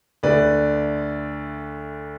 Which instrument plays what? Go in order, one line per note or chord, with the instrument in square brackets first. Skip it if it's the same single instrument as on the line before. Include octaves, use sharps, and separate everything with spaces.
[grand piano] D2 D3 A3 B4 D5